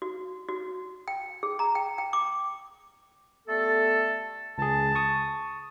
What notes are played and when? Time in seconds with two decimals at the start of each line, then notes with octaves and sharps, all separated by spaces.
0.02 F#4
0.48 F#4
1.08 G5
1.43 G#4
1.59 A#5
1.75 G5
1.98 G5
2.13 D6
3.48 G3 A3 B3 A4
4.58 C#2 G#4 A5
4.95 C#6 D#6